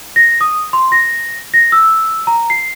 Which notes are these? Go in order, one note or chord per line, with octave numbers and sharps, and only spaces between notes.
A#6
D#6
C6
A#6
A#6
E6
A#5
C7